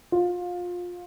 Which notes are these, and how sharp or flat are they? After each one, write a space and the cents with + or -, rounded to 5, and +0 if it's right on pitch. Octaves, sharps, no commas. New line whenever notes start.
F4 +25